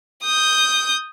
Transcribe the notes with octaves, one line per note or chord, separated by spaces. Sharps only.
D#6 G6